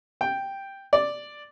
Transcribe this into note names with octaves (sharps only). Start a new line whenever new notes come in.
G5
D5